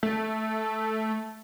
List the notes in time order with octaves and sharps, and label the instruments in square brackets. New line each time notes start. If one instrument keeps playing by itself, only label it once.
[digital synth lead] A3